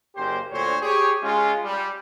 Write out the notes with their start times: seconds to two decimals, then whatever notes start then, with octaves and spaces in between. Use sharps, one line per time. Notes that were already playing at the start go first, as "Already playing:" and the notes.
0.16 F#1 A#3 G4 C5
0.51 D2 A#2 D3 C5 C#5
0.81 G4 G#4 C#5
1.23 G#3 C#4 F4
1.63 G3